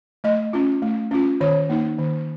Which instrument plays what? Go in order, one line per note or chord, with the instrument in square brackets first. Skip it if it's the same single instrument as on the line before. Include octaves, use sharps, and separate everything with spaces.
[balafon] A3 D#5
C#4 F4
A3
C#4 F4
D#3 C#5
A#3 D#4
D#3